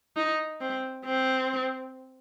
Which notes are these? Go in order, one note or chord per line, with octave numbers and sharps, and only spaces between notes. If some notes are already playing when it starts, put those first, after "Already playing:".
D#4
C4
C4